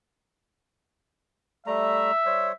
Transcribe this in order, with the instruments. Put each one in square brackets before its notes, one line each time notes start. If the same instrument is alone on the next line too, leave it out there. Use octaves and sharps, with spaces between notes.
[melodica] G3 A3 A#5 [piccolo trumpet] E5
[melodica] G3 C5 C#5